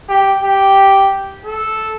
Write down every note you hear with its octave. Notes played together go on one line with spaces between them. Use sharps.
G4
G4
A4